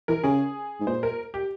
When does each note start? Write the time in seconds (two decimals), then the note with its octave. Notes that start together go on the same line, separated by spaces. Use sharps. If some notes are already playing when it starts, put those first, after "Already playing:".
0.08 E3 A#4
0.23 C#3 G#4
0.80 G#2
0.87 A#2 C5
1.03 A#4
1.34 G4